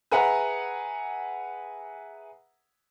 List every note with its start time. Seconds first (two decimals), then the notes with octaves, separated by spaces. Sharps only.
0.11 G#4 B4 E5 F#5 A#5 F#6